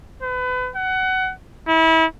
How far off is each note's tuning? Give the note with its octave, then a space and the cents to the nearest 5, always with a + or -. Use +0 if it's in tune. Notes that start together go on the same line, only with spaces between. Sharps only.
B4 +30
F#5 +20
E4 -30